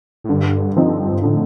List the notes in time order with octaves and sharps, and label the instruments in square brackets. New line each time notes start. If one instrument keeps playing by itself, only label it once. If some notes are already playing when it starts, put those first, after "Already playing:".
[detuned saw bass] A2
[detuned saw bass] G2 [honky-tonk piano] D3
[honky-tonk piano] F3 C4 D#4
[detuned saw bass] G2
[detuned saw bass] A2 [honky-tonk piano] D3